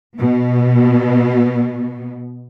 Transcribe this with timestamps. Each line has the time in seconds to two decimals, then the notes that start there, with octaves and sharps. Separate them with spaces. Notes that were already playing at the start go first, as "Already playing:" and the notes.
0.17 B2 B3